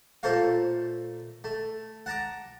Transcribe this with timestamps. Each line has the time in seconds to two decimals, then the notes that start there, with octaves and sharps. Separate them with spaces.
0.23 A#2 A3 A4 C5 C#5 F5
1.44 A3
2.06 F#5 A5 A#5 D6